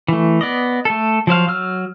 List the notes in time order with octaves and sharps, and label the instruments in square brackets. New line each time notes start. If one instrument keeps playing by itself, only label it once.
[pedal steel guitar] E3 A3
B3 D5 D#5
A3 A4
F3 F#3 C5 F5
F#3 E6 F6